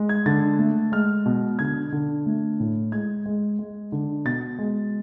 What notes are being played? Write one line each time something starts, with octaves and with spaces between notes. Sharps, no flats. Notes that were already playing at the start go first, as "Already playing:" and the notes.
Already playing: G#3
G#6
D3 A6
A3
G#3 F6
B2
D3 G#6
D3
A3
A2
G#3 G#6
G#3
G#3
D3
B2 A6
G#3